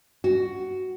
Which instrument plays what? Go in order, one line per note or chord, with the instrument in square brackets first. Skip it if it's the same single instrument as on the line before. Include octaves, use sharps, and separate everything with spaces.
[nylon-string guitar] F#4